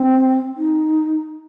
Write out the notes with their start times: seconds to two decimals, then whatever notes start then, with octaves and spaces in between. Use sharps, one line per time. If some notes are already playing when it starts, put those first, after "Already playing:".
Already playing: C4
0.57 D#4